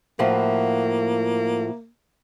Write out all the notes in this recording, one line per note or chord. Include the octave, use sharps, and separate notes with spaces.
A2 F3 A#3 F#4